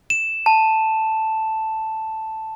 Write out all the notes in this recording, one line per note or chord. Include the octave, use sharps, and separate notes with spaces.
E7
A5